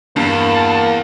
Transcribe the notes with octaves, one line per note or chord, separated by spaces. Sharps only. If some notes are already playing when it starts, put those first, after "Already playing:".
E2 G2 A#3 A5